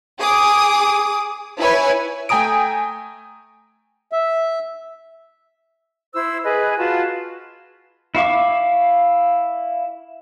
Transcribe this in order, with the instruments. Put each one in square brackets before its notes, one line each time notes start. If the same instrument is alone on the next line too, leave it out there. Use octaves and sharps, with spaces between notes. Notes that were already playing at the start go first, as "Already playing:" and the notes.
[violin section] G#4 D6 D#6
E4 B4 C#5 G#5
[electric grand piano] A3 G5 G#5 A#5 D#6 D7
[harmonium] E5
[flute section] E4 C5 E6
G#4 B4 D#5
F4 F#4 B4 A5
[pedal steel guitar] E4 F5 C#6 D6